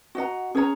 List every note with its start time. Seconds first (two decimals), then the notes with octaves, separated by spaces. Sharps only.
0.15 F#4 D#5 F#5 A#5
0.55 C#4 G#4 C#5 A#5